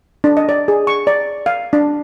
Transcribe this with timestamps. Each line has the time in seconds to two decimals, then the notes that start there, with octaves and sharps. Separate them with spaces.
0.24 D4
0.37 D#5
0.49 D5
0.68 G#4
0.87 C#6
1.07 D5
1.46 F5
1.73 D4